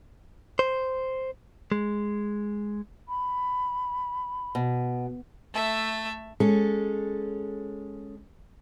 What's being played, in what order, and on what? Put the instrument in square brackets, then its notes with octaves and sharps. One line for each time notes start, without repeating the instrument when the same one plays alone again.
[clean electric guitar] C5
G#3
[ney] B5
[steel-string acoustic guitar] B2
[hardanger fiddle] A3 E5
[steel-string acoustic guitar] G#3 C#4 A4